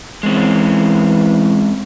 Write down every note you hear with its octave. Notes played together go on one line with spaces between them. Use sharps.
E3 G#3 C4 C#4